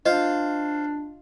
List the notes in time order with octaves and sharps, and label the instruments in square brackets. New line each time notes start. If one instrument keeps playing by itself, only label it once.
[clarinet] D4 [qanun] F4 [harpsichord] C5 F5 [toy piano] D#5